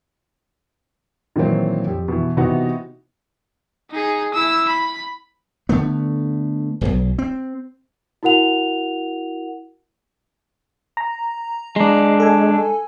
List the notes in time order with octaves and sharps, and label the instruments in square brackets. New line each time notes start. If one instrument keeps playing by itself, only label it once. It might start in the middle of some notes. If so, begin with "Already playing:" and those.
[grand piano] A#2 D#3 E3 F#3 A#3 C4
F2 G4
B2 E3
C3 E3 B3 D#4 F#4
[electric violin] D#4 G#4
E4 E6
B5
[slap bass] D3 A3 B3
D1 B1
C4
[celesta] E4 F#4 A#4 F#5 F7
[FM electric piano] A#5
[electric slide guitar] G#3 D4
[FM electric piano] A4 G#5